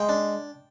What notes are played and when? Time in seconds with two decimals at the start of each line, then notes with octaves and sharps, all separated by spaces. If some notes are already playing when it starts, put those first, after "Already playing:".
Already playing: G#3 G5
0.09 D4